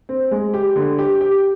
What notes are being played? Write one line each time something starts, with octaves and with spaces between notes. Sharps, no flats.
C4
G#3
G4
D3
G4
G4